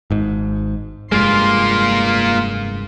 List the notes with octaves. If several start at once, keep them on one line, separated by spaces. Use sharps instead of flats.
G#1 G#2
F1 G2 G#3 A#3 F4 C6